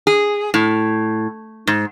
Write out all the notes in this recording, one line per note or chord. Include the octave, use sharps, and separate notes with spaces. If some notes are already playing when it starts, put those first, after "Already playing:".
G#4
A2
G#2